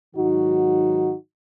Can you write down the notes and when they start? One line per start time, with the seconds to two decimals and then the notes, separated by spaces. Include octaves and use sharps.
0.15 G#2 D#3 F#3 D#4 F#4